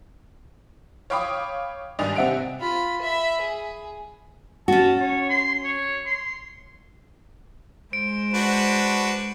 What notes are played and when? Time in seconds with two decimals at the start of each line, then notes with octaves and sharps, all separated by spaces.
1.10 C#5 F5 G5 B5 D6 D#6
1.99 G#1 G2 D5 D#5 G#5 F7
2.15 C3 C4 E5 F#5 D7 F7
2.59 F4 B5
3.02 E5 B5
3.41 G#4
4.68 C#4 F#4 A5
5.00 C#5
5.29 C6
5.64 C#5
6.06 C6
7.93 G#3 C5 D7
8.34 D4 F#4 B4